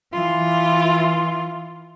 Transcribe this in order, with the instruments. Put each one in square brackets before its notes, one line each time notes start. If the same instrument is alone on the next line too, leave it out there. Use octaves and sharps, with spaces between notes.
[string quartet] E3 F4